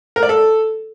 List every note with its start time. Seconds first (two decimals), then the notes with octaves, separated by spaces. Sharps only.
0.16 A#4
0.23 D5
0.29 A4